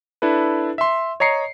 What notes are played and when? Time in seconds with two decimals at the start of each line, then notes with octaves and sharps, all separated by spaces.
0.22 D4 E4 A4 B4
0.78 E5 C6
1.20 C#5 D#5 A#5 C7 C#7